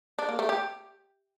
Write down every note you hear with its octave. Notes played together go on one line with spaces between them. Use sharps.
D4
A#3
A3
G4